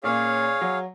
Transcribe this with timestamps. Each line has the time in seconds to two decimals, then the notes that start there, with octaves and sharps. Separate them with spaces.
0.04 A#2 A#3 C#4 G#4 C#5 F5
0.61 F#3